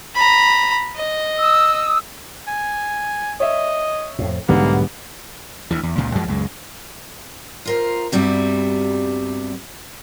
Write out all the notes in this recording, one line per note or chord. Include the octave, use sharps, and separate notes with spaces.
A#5 B5
D#5
D#6 E6
G#5
C#5 D#5 E5
F2 A2
B1 G#2 D3 G3 G#3 A#3 B3
D2 E3
E2
C#2 A#2 C#3
F#2 F3 F#3 G#3
C#2 F#2 G#3
F4 A#4 C5
G2 C3 G3 B3 F#4